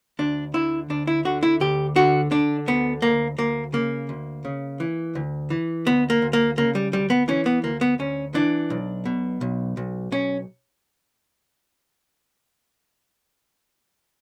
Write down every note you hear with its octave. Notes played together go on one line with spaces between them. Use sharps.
D2 D4
D3 E4
D2 D4
E4
D3 F#4
E4
D2 G4
D3 F#4
D3 D4
D2 B3
D2 A#3
D2 A#3
C#3 A#3
D2
C#3
E3
D2
E3
D2 B3
A#3
D2
A#3
C#3 A#3
G3
D2 G3
B3
E3 C#4
B3
D2 A#3
B3
D2 C#4
E3 D4
B1
B2
B1
B1
B1 C#4